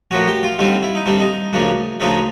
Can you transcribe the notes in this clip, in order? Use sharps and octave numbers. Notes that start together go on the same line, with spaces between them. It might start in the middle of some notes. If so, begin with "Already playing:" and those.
A2 F3 A#3 C#4 F#4
G4
F4
D#2 D3 G3 C4 F4
E4
D#4
D#2 D3 G3 C4 D4
D#4
D2 C#3 F3 A#3 D4
D2 C#3 F3 A#3 D4 D#4